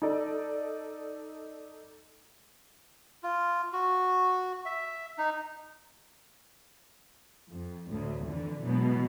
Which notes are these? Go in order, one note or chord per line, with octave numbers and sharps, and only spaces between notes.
D#4 A4 D5
F4
F#4
E5
D#4
F2
D2 A2
F2 D3 E3
B2 E3 F#3 G#3 B3